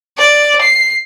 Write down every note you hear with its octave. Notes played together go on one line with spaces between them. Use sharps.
D5
C7